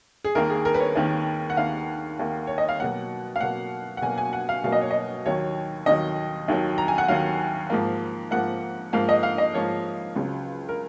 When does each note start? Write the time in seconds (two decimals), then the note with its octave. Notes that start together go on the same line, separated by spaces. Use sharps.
0.24 G#4
0.35 D#2 D#3 A#3 A#4
0.50 G#4
0.65 A#4
0.75 B4
0.80 C#5
0.95 D#2 D#3 A#3
1.50 F#5
1.57 D#2 D#3 A#3 F5
2.19 D#2 D#3 A#3
2.47 C#5
2.58 D#5
2.69 F5
2.79 B2 F#3 A#3 F#5
3.36 F5
3.41 B2 F#3 A#3 F#5
3.97 F#5
4.02 B2 F#3 A#3 G#5
4.18 G#5
4.33 F#5
4.49 F5
4.64 B2 F#3 A#3 F5
4.72 D#5
4.81 C#5
4.91 D#5
5.26 D#2 D#3 F#3 C#5
5.86 D#2 D#3 F#3 D#5
6.48 D#2 D#3 F#3
6.78 A#5
6.88 G#5
6.98 F#5
7.08 D#2 D#3 F#3 F5
7.70 G#2 F3 A#3
8.31 G#2 F3 A#3 F#5
8.93 G#2 F3 A#3 F5
9.09 D#5
9.23 F5
9.38 D#5
9.54 G#2 F3 A#3 C#5
10.16 C#2 C#3 F#3
10.69 A#4